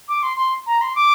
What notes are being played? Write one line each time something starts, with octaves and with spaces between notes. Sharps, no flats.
D6
C6
C6
A#5
C6
D6